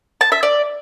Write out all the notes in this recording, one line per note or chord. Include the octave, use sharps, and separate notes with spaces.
A5
E5
D5